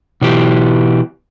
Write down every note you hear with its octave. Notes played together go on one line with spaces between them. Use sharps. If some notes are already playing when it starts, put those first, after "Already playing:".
B2 E3 G4